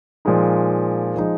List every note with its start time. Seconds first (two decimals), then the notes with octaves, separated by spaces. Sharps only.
0.25 A#2 F3 G#3 D#4
1.16 F3 G#3 D#4